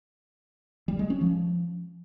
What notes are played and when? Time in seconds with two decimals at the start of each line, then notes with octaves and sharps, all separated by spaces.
0.88 G3
0.99 G#3
1.10 C#4
1.21 F3